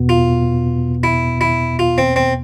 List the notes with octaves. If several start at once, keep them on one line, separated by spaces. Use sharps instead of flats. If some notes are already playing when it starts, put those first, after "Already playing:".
Already playing: E2 B2 B3
F4
E4
E4
F4
C4
C4